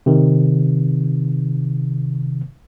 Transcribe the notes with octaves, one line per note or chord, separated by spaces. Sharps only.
C3 D#3